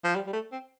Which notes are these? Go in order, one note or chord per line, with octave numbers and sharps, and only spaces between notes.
F3
G3
G3
A3
C4